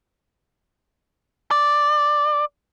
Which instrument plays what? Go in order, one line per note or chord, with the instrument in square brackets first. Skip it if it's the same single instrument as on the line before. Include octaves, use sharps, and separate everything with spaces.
[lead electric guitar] D5